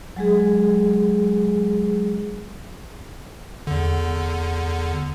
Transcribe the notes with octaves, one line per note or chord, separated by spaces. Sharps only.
F#3 G#3 G#4
E2 D3